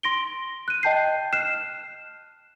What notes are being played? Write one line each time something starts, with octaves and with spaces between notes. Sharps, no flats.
C6 A#6 D7 G7
F#6 D#7
D#5 G5 A5 G6 C7
F6 F#6 C7 E7